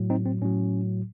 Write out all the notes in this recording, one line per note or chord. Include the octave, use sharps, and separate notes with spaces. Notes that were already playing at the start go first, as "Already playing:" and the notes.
Already playing: A2 F#3
C4 D#4
C4
A2 F#3 C#4